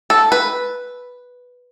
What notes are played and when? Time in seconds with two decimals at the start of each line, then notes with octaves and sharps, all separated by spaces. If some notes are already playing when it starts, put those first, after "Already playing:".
0.10 A4
0.32 B4